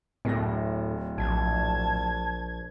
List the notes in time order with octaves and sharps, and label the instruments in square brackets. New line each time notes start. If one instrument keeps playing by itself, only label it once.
[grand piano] D1 A#6 [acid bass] A2
[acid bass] A#1 [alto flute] A5 [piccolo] G#6